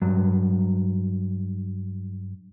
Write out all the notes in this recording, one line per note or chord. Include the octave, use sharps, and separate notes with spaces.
G2 F#3